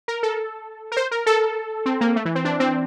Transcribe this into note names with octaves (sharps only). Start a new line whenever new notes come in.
A#4
A4
A#4
C5
A#4
A4
C4
A#3
A3
E3
C4
D4
C4